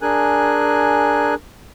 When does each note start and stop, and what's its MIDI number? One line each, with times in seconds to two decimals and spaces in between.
0.02 1.35 62
0.02 1.35 68
0.02 1.35 70
0.02 1.35 80
0.02 1.35 90